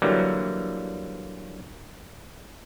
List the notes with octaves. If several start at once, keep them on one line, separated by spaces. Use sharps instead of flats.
D3 E3 F#3 G3 A#3